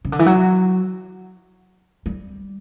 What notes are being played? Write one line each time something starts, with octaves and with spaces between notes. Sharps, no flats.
C#3
D3
E3
F#3
G3